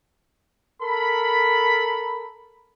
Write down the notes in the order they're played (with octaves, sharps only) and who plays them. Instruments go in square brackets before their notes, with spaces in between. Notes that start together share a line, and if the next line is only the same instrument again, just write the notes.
[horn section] A4 A#4 B5